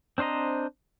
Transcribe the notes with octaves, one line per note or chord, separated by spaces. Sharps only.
C4 D4 C5 D#5 A#5